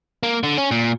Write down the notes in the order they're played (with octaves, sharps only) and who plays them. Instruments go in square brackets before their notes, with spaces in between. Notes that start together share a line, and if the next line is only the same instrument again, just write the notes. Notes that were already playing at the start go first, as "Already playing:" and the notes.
[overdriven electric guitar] A#3
D3
C#4
A#2